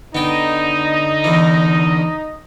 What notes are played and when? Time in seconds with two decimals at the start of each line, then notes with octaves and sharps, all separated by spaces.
0.15 D3 B3 D#4 D#5 G5
1.24 E2 E3